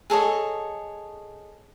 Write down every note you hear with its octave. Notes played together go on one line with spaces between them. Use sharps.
G#4 A4 C#5 D#5